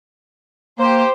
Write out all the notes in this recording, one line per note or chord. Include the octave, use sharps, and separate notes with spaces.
A#3 G4 C5